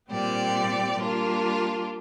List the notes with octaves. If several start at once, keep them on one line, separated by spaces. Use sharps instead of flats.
A#2 G3 C4 G4 D5
G3 A#3 D4 F4